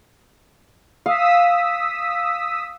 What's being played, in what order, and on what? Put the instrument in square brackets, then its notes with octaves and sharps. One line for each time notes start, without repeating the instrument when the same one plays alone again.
[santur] F5 [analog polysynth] D#6 E6 B6